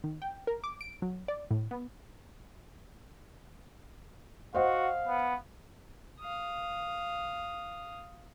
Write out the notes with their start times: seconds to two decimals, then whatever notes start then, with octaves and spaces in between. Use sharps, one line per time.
0.04 D#3
0.22 G5
0.47 A#4
0.64 D6
0.81 D7
1.02 F#3
1.28 D5
1.51 A2
1.71 B3
4.54 F#4 C5 D#5 F5 F#5
5.07 B3
6.20 F5 D#6